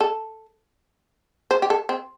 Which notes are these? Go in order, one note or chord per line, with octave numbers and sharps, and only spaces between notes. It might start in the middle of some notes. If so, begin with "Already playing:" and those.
A4
C5
G4
A4
C4